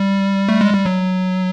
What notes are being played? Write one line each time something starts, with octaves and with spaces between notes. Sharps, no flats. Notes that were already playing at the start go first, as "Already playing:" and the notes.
Already playing: G3
A3
G#3
G3
F#3